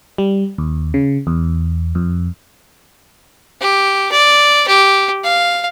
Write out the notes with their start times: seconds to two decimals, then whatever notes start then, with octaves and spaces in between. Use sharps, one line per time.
0.18 G3
0.58 D#2
0.94 C#3
1.27 E2
1.95 F2
3.61 G4
4.12 D5
4.67 G4
5.24 F5